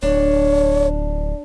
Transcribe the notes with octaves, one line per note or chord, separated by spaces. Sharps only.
D1 D4 C#5